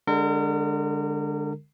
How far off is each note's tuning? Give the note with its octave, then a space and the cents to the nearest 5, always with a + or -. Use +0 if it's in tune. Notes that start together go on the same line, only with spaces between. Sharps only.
D3 +0 G#3 -20 A#4 -35